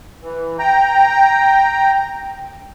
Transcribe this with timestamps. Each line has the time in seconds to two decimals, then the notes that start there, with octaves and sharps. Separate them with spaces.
0.22 E3
0.59 G5 A#5